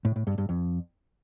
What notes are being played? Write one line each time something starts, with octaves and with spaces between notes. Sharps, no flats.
A2
A2
G2
G2
F2